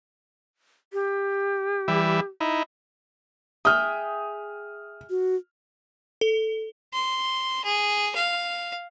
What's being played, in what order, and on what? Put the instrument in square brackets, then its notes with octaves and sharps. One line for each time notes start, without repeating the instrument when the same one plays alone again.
[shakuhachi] G4
[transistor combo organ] E3 G3 E5
D#4 E4
[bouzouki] G#4 E5 G5 [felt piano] D#6 F6
[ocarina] F#4
[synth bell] A4
[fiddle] C6
G#4
F5